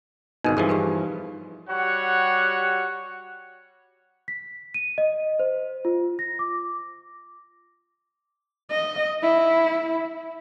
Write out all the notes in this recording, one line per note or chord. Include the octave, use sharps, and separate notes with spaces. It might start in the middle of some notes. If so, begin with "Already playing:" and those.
G#1 G#2 B2 D#4 A#4
G2 E3 F3 G#4 A#4
G4 G#4 B4
G3 F#4 C#5 F#5
B6
D#7
D#5
C5
F4
A#6
D6
D#5
E4